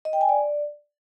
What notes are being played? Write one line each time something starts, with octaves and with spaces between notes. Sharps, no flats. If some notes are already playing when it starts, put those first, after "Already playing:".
D#5
G5
G#5
D5